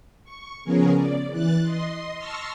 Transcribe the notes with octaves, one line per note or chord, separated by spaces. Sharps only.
C#6
C#3 F3 B3 C#4 G#4 A#4
D5
E3 F#6 A6
D#5 C6
A5 C6 C#6 E6 F6 A#6